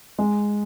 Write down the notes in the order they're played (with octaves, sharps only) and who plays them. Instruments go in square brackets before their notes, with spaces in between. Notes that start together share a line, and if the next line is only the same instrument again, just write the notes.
[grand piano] G#3